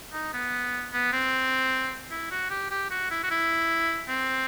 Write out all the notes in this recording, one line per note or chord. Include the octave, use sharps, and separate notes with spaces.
D#4
B3
B3
C4
E4
F#4
G4
G4
F#4
E4
F#4
E4
C4